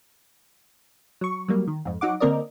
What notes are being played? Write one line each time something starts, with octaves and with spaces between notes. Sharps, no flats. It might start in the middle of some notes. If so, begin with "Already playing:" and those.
F#3 C#6
F#3 G3 A#3
D#3
F2 G#2
F#3 D#4 F#5 D6
D3 A#3 C4 A#4 D5 D#5